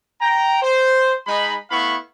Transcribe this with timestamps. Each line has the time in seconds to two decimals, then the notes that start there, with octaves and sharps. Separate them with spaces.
0.20 G5 A#5
0.62 C5
1.27 G#3 D#4 B5
1.70 A3 B3 E4 F5 B5 C#6